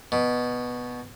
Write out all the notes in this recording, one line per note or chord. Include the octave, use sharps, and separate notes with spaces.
B2